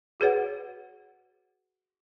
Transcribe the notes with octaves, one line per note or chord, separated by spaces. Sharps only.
F#4 G#4 B4 C#5 F#5